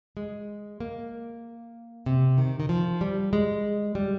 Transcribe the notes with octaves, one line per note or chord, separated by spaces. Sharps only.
G#3
A#3
C3
D#3
D#3
F3
G3
G#3
G3